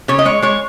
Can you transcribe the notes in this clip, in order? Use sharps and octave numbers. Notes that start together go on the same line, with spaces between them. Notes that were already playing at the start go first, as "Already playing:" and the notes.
C#3 C#5
D#5
G#3 C#5
G#3 C#5